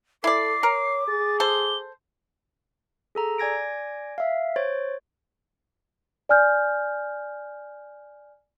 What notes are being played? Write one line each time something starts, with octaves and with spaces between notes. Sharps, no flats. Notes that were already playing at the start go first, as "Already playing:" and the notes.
E4 A4 D5 D6 C7
A#4 C#5
G#4 A6
A4 C5 G7
G#4 A4 A#5
D5 G#5 G#6 A#6 D7
E5 F5
C5 C#5 A6
D5 G#5 F6 G6